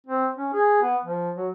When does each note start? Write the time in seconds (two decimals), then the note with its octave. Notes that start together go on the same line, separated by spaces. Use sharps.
0.07 C4
0.36 C#4
0.53 G#4
0.82 B3
1.05 F3
1.36 F#3